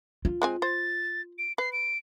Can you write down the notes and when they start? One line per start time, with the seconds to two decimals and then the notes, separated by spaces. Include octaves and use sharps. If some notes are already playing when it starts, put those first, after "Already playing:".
0.25 F4
0.42 G#3 C4 G#5
0.62 C5 A6
1.38 D7
1.58 B4 C7
1.73 D7